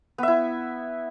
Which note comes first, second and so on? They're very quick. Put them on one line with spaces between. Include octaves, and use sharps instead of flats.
B3 E5 E4